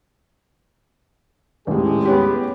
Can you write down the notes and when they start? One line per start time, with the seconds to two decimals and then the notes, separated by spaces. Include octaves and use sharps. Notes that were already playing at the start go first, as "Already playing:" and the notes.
1.67 D#1 A2 G#3
2.05 B3 C#4 G4